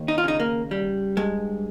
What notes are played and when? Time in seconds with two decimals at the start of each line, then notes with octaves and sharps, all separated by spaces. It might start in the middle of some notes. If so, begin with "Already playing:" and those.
Already playing: D#2
0.08 D#4
0.18 F4
0.24 C#3 D#4
0.40 A#3
0.71 G3
1.17 G2 G#3